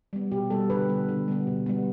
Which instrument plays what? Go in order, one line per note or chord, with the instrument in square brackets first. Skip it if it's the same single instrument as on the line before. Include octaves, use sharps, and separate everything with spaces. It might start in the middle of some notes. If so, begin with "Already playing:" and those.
[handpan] G3 B3
B2 G4
G3 B3 A4
D3 B4
G3 B3
D3
G3 B3
B2
G3 B3